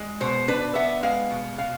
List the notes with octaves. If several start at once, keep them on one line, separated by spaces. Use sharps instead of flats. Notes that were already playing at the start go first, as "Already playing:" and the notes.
Already playing: G#3
B2 C5
D4 B4
B3 E5
G#3 F5
B2
B2 F5